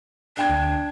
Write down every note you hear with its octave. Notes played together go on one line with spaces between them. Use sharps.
D4 D5 G5 G#6
D2